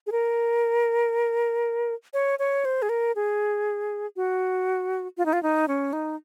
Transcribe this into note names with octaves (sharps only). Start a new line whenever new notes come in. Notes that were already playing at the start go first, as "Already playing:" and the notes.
G#4
A#4
C#5
C#5
C5
G#4
A#4
G#4
F#4
F4
D#4
F4
D#4
C#4
D#4